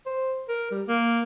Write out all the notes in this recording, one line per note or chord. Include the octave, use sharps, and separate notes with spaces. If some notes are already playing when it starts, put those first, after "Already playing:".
C5
A#4
G3
A#3